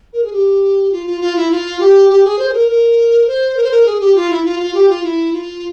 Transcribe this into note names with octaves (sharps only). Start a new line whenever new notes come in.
A#4
G#4
G4
F4
F4
F4
E4
F4
G4
G4
G#4
C5
G#4
A#4
A#4
C5
A#4
C5
A#4
G#4
G4
F4
E4
F4
F4
G4
F4
E4
F4